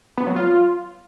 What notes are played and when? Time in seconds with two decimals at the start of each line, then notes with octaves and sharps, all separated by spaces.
0.17 B3
0.27 F#3
0.36 F4